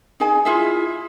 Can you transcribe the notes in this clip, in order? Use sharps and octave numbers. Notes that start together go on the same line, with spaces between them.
D#4 G#4 G#5
E4 F4 G#4 E5